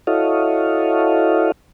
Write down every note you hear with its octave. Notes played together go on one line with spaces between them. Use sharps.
E4 F#4 A4 C#5 D#5 F5